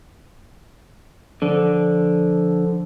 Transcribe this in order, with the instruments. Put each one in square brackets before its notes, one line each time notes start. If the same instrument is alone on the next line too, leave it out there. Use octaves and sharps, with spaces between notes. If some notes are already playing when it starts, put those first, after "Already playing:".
[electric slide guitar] D3 [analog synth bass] F3